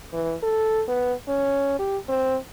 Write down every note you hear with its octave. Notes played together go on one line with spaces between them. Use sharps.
E3
A4
B3
C#4
G4
C4